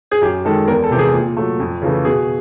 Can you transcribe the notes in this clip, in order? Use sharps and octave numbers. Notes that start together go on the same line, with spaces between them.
G#4
F#2 G4
D#3 G#3 A4
E2 A#4
A4
C3 E3 G4
G#4
A#2
F#3 A3
F2
C#3 E3 A3
B2 G#4